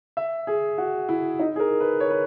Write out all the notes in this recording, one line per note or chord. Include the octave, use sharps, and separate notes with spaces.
E5
G#4
F#4
E4
D#4
G#4
A#4
B4
C#5
B4